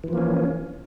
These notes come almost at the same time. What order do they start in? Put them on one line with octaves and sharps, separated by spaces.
E3 F3 A#3 C#4